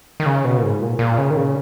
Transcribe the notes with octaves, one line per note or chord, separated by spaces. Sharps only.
D#3
C#3
B2
A#2
G#2
A#2
A#2
C#3
D#3
C#3